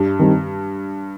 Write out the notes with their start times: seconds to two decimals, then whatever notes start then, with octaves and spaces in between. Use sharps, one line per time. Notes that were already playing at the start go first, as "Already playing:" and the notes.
Already playing: G2
0.19 D#3 G3 C4